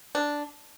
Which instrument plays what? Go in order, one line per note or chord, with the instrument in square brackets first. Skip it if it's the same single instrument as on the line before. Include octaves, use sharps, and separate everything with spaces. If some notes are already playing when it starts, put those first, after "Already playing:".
[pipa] D4